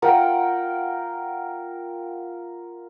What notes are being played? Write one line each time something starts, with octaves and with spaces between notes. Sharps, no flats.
F4 A#4 F#5 G5